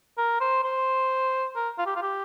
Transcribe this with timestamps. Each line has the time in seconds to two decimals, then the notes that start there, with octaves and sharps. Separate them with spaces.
0.18 A#4
0.41 C5
0.64 C5
1.56 A#4
1.78 F4
1.86 G4
1.96 F4
2.02 G4